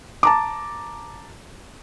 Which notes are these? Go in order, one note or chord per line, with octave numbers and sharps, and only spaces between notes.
A5 A#5 D6